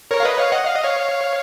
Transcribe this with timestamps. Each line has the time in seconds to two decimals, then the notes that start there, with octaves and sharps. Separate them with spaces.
0.11 A#4 C#5
0.20 F5
0.25 B4 D#5
0.38 C#5 F5
0.52 D#5 F#5
0.66 F5
0.76 D#5
0.84 C#5 F5